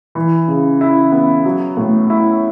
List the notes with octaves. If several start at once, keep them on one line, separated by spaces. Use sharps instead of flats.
E3
C#3
E4
B3
F#3
A2
E4